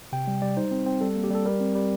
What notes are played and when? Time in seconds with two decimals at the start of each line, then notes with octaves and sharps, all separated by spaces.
0.12 C3 G5
0.27 G3
0.42 G3 D5
0.57 D#4 C5
0.71 C4
0.86 C4
1.01 G3 A4
1.16 A#3
1.24 G4
1.31 G3 A4
1.45 G3 A#4
1.60 C4
1.75 G3